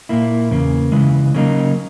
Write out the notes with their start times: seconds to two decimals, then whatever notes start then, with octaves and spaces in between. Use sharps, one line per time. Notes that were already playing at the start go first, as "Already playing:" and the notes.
0.09 A#2 A#3 E4
0.51 E2 C#3 A#3
0.92 C#3 E3 G#3
1.34 C#3 F#3 A#3 D#4